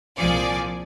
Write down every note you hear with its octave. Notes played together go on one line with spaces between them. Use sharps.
C2 A#2 F3 G#4 D5